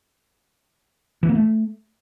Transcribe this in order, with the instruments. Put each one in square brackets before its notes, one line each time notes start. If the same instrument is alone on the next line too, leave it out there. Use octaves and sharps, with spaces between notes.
[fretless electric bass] E3
A#3
A3